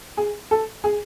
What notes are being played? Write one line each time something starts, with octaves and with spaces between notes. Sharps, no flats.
G#4
A4
G#4